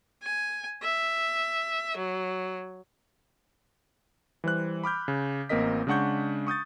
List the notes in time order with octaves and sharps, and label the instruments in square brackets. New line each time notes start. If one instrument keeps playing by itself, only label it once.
[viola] G#5
E5
F#3
[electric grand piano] E3 G3 C5 F#6
B5 D6 F6 G6
C#3
A1 A#3 C4 A#4 D#5 B6
C#3 G#3 D4 F#5 C#6 G6
C#6 D#6 G6 A6